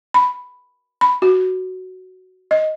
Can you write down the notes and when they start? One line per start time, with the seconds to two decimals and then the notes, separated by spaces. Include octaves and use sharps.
0.14 B5
1.01 B5
1.22 F#4
2.51 D#5